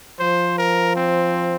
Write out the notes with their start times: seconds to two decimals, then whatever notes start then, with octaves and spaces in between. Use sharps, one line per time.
0.19 F3 C5
0.58 A#4
0.96 C4